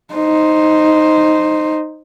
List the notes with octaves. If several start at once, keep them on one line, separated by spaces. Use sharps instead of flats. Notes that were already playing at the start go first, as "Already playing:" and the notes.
D#4 C5